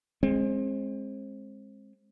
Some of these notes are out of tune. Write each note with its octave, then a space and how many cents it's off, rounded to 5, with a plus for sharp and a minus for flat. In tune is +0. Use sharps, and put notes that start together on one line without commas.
G#3 +0 C4 +30